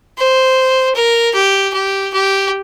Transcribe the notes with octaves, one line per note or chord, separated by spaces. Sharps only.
C5
A#4
G4
G4
G4